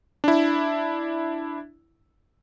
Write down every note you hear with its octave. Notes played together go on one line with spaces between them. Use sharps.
D4 E4